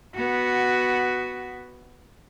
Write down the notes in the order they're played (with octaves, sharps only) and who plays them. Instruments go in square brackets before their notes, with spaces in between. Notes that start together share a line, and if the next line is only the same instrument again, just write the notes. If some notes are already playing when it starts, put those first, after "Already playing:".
[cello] B3 F#4